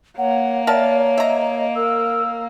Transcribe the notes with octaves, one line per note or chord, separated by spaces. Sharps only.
A#3 C#5 F#5
A#4 C#5 D5 E5 A5
D#5 E5 A#5
A#4 E6